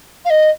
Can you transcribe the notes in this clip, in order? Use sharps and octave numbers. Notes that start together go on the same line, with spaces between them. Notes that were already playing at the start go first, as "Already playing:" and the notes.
F5
D#5